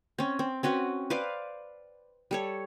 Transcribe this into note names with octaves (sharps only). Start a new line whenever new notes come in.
C4 C#4
C4
C4 C#4 F#4 B4
B4 C5 D5 F5
G3 A4 C#5